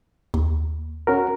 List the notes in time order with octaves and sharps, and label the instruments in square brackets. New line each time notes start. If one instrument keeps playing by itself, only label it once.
[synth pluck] D#2
[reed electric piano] C#4 F#4 A#4